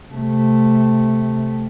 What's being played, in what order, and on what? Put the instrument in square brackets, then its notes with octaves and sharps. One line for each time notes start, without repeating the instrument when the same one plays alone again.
[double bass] C3 A3